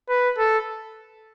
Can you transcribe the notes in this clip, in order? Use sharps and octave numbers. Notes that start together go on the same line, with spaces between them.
B4
A4